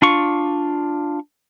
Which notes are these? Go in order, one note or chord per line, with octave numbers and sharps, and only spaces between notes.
D4 F4 C#6